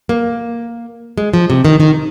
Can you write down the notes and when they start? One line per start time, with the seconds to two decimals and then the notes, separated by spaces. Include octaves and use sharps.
0.09 A#3
1.18 G#3
1.34 F3
1.50 C3
1.65 D#3
1.80 D#3